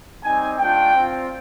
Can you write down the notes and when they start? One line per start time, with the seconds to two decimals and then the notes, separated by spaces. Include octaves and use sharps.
0.23 G3 C4 D#4 G#5
0.58 A3 D4 F4 G5
0.92 C4 F4